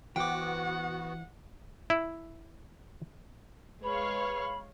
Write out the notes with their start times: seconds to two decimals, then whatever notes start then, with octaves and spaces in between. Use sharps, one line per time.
0.16 E3 B3 F#4 C5 F#5 G5 D6
1.90 E4
3.84 G#3 B4 C#5 F5 B5